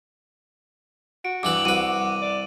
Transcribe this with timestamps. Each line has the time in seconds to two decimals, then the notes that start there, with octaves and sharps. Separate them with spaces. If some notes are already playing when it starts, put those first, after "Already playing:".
1.25 F#4 D7
1.43 G2 E3 B4 D6 F#7
1.65 C2 F#4 B4 D#7
2.22 D5